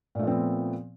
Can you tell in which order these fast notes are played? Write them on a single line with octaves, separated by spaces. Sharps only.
A#2 A3 F3 C4 B3